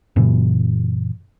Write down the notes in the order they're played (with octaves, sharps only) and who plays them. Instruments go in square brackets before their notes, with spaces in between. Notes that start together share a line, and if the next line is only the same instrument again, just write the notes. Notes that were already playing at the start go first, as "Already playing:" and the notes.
[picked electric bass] F#2 A#2 C#3 E3